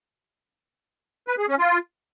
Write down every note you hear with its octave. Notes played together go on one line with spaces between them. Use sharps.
B4
G#4
C#4
F4